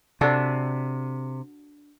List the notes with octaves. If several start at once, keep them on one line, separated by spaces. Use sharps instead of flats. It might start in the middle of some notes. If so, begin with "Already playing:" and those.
C3 D4 F#4 A4